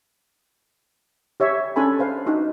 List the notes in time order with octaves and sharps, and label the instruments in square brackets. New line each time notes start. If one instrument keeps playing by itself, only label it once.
[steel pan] G4 C#5 E5
C#4 D4 A4 G#5 B5
B4 C5 F5
D4 D#4 F#4